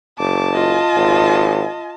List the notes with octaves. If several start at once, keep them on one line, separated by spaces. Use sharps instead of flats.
F#1 A5 D6
F4 D#5
G#1